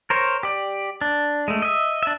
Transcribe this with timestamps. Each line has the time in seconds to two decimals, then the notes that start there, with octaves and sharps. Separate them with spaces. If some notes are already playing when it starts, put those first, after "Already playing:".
0.10 A#4 C5 C#5
0.43 G4 D5
1.01 D4
1.48 G#3 A3
1.62 D#5 E5
2.03 D4 E5